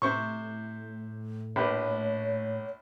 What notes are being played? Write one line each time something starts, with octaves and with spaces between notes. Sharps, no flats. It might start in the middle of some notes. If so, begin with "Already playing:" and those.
A2 C3 C5 C#6
A#1 G4 B4 C#5